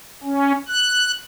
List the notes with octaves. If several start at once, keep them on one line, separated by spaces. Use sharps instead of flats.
C#4
F#6